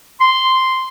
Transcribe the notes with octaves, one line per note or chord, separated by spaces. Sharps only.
C6